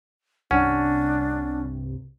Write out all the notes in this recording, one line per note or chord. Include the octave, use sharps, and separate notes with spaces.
C2 G2 C3 C#4 D4 F#5